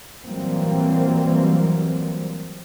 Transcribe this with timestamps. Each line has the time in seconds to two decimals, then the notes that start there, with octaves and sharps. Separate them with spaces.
0.24 E3 F#3 G3 A#3 C4